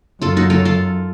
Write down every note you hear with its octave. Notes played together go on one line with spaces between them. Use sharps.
F#2 F4 A4
D#4 F#4
F4 A4
F4 A4